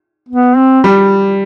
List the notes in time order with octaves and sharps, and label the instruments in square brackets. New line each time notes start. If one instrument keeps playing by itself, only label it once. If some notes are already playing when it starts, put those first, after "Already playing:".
[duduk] B3
C4
[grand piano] G3